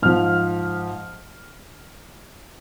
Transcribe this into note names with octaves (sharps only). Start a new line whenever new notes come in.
G#2 F3 F6